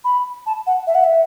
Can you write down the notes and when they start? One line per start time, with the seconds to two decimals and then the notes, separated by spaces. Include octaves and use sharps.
0.05 B5
0.46 A5
0.67 F#5
0.87 E5
0.95 F#5
1.04 E5